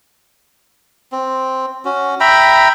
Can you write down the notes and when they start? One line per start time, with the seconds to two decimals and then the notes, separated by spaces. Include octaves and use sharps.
1.12 C4
1.85 C#4 F#4
2.20 E5 G5 A#5 B5